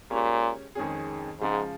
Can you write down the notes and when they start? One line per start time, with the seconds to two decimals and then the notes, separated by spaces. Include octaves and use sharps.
0.10 A#2 G#3 C#4 G4 C#5
0.75 F2 D#3 G#3 C#4 G#4
1.41 G#2 C#3 F3 G#3